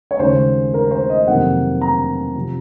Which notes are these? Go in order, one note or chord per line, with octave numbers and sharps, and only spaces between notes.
C#5
D#2 C#3 G#3 C5
A#4
C5
D#5
F2 C3 D#3 F#3 A#3 F#5
A#5
C3 F3